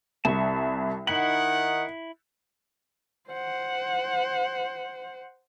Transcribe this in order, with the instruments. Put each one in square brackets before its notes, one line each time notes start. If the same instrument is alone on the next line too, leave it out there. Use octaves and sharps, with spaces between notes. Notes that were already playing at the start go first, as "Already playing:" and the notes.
[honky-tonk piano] C2 [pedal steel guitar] A5 C#6
[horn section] D#3 D#4 F#5 [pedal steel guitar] E4 [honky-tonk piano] F#7
[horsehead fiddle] C5 F#5